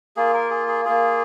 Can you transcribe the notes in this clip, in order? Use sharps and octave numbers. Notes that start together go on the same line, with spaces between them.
A#3 F4 G#4
A#4
G#4
G#4
A#3 F4 G#4